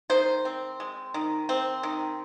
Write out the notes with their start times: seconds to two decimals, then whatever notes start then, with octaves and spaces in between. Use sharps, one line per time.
0.10 D#3 C5
0.45 C4
0.80 G#3
1.14 D#3
1.49 C4
1.83 D#3